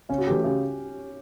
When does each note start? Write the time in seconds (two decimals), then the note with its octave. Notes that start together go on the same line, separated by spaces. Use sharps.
0.09 C#3 C#4
0.18 F#4
0.26 A3 G4
0.31 E3
0.44 C#3 G4